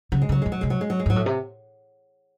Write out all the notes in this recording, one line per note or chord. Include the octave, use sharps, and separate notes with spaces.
C#3 F#3
G#3
C#3 F#3
A2 G#3
F#3
C3 G#3
F#3
G#3
F#3
G#3
G#2 F#3
A2
C3